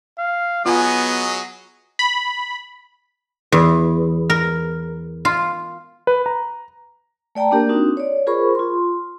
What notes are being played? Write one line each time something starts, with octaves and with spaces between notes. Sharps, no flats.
F5
F#3 B3 F4 G#4 D#5 G#5
B5
E2
A#4
F4
B4
A#5
A3 D5 G5 A5 A#5
A#3 D4 G4 A#4
C4 D4 D#4 F#4
C#5 D5
F4 G#4 A#4 C5 B5 C#6
F4 C6